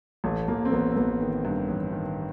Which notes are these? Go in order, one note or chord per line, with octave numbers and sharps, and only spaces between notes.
A1 A3
A1 A#3
C4
A1 B3
C4
A1 B3
D#3
G2
A1
D#3